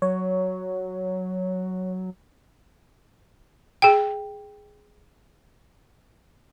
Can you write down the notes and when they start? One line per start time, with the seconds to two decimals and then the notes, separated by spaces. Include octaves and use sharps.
0.02 F#3 C#5
3.82 G#4 G5